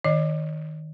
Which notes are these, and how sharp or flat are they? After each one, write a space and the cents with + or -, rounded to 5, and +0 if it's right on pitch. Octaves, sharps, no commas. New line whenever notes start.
D#3 +0 D#5 -25